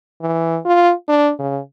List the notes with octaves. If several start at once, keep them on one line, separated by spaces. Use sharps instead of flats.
E3
F4
D4
C#3